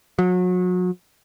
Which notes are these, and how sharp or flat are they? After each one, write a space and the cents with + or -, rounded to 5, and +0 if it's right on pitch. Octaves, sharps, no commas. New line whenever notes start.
F#3 -35